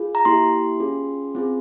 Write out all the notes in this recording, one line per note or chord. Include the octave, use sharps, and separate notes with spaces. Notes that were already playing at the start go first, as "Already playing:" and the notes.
Already playing: F4 G#4
A#5
A#3 E4 G4 C6
C#4 F4 G#4
C4 F4 G#4